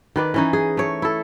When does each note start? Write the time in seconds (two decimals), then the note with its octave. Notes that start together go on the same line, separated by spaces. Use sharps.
0.16 D#3 B4 D5
0.34 E3 C#4 D#4
0.53 G#4
0.77 A3 C#5
1.02 E4 A4